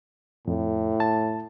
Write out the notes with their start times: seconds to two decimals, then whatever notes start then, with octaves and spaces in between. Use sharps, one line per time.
0.48 F2 A2
1.00 A5